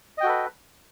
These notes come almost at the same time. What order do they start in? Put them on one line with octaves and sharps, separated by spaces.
D#5 G5 F#4 A4 B4